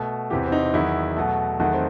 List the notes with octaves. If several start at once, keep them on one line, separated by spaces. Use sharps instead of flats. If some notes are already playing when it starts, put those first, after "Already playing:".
Already playing: B2 A3
E2 C3 E3 G4
C4
D#4
E2 D#3 F#3 E4
B2 F#3 A3
E2 D#3 F#3 A3 F#4
C4